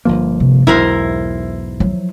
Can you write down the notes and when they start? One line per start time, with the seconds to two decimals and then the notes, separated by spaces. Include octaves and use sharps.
0.05 G1 F3 A#3
0.40 C3
0.67 B1 E2 G#2 B3 E4 A#4 C5
1.80 F3 F#3